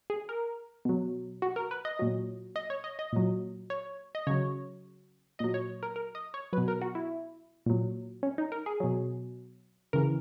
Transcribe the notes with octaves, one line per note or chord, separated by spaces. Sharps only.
G#4
A#4
B2 F#3
F#4
A#4
B4
D#5
A#2 F#3
D#5
C#5
D#5
D#5
A#2 F#3
C#5
D#5
C#3 F#3 C#5
A#2 F#3 D#5
C#5
A#4
A#4
D#5
C#5
F#3 B4
B2
A#4
F#4
E4
A#2 F#3
C#4
D#4
A#4
G#4
B2 F#3
C#3 E3 A#4